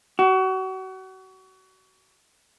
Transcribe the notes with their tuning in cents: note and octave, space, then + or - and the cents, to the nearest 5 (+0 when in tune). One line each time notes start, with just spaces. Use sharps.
F#4 +30